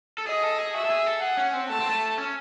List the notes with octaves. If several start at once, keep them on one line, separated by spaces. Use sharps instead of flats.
A4
G#4 D#5
A4
G#4
F#4 E5
A4
G#4
A4
G#4 F#5
C#4
C4
A3 A5
C4
A3
C#4